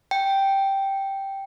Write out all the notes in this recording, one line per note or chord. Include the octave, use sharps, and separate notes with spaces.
G5